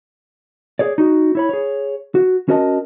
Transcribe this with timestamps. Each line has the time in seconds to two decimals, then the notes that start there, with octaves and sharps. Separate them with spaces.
0.79 G#4 C#5 D5
0.98 D#4 F#4
1.35 E4 C#5 B5
1.49 G#4 C#5
2.15 F#4
2.48 C#4 F#4 A#4 D#5 A5